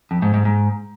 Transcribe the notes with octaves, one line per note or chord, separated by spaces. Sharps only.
F2
G#2
G#2
G#2